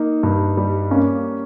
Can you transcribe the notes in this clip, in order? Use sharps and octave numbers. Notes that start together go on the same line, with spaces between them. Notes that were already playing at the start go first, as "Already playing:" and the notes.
Already playing: A#3 D#4
G2
G3
A#3 C#4